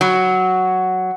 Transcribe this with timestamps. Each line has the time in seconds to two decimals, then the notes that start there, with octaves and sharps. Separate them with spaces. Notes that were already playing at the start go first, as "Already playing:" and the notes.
0.01 F#3